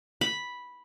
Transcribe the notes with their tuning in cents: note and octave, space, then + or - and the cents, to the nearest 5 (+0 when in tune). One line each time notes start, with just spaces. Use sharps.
B5 -5